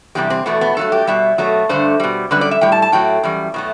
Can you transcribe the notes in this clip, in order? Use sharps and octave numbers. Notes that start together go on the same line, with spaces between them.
E2 C3 G3 G4
C4
E2 B2 A3 B3
B3
G2 F#3 A3 A4
G4
B2 G3 E5
B2 F#3 A3
G2 D3 A3 C5
B2 G3
F#2 D3 G3 B4
D5
E5
A2 G3 G5
A5
A5
A2 F#3 A3 G5
F#2 E3 G3
B2 F#3 A3